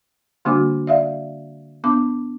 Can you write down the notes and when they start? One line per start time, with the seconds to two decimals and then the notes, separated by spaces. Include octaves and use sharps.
0.45 D3 G3 A#3 D4 F#4 D6
0.87 D5 E5 F5
1.84 B3 D4 D6